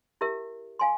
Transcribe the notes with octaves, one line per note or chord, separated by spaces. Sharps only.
E4 G4 A#4 E5
F5 G#5 C6